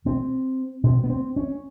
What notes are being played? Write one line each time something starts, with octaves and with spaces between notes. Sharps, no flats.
B2 C4
B2 C4
B3
C4
C#4